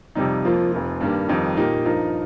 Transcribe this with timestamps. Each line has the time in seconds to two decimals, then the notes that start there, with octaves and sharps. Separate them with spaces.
0.15 F2 C3 G3 D#4
0.44 F2 F3 A#3 F4
0.72 F1 F2 F3
1.01 G2 D#3 G3 A#3
1.29 F2 D#3 G3 D#4
1.57 A#2 A#3 D#4 G4
1.85 G2 F3 D#4 A#4